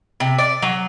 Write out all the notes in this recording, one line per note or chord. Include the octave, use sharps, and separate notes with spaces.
C3
D5
F#3